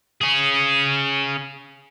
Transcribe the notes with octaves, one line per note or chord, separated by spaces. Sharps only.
C#4 G#4